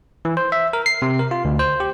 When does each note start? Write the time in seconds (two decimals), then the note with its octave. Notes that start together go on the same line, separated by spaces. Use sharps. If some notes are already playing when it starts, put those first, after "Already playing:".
0.25 E3
0.37 C5
0.52 E5
0.73 A#4
0.86 C7
1.02 C3
1.19 A#4
1.31 F4
1.45 D2
1.59 C5
1.80 G4